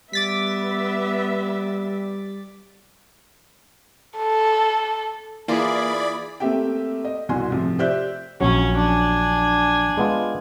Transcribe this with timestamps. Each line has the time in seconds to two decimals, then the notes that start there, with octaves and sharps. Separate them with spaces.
0.13 G3 B3 E5 D6 A6 B6
4.18 A4
5.48 E3 A#3 F4 G#4 D5 B5
6.40 A3 A#3 C4 G4 E5 G5
7.05 D#5
7.29 C2 B2 F#4 G#5 C6
7.52 A2 C3 F3
7.79 G4 C5 D5 E5 F#6 G6
8.41 A#1 F#3 C#4
8.77 D4 G#5
9.97 G#3 B3 F4